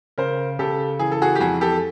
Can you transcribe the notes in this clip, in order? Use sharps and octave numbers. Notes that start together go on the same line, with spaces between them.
C#3 A#4 C5
C#3 G4 A4
E3 G#4
A4
F#4 G#4
G4
F2 F#4 G#4
G4 A4